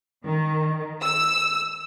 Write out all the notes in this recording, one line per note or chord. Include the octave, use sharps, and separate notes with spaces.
D#3
E6